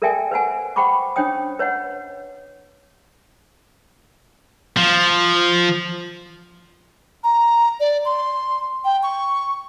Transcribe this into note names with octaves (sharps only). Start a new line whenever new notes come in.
A4 A#4 D5 E5 G5 G#5
B4 C5 F#5 G#5
C5 F#5 G5 B5 C#6 D6
C#4 D4 C5 C#5 G5 D#6
B4 C#5 D#5 F#5
F3
A#5
D5
C6
G5
C#6